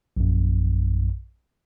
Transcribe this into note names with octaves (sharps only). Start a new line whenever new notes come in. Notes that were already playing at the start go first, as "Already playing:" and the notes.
A#1 F#2